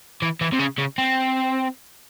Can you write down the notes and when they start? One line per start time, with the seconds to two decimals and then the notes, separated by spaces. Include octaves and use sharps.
0.22 E3
0.41 E3
0.53 C3
0.60 C#3
0.79 C#3
0.98 C4